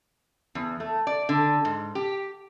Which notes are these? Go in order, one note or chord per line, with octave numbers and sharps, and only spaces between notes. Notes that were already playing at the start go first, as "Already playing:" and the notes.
E2
A3
D5
D3
G#2
G4